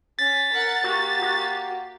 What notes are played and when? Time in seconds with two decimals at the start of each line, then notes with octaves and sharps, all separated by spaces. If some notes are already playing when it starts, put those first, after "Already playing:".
0.19 C#4 A6 B6
0.52 A#4 F#5
0.84 A#3 F#4 G4
1.22 F#4